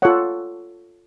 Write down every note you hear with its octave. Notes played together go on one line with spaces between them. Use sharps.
F4 A4 C#5 F#5